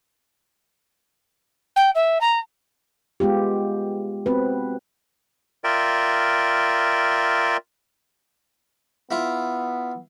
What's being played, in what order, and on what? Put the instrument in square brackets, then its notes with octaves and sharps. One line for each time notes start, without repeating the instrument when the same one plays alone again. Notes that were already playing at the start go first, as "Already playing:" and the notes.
[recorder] G5
E5
A#5
[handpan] G#3 B3 F4 G4
B3 C4 F#4 B4
[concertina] F4 A#4 D5 E5 G5
[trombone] B3 [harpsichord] E4 F4